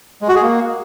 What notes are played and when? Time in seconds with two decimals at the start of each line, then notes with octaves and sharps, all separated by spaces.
0.22 G#3
0.29 F#4
0.35 G#4
0.42 A#3